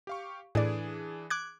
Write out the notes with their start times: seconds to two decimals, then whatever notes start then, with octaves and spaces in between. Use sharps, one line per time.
0.07 G4 F5 C#6
0.55 A2 E3 D4 G#4 D5
1.30 D6 F#6 G#6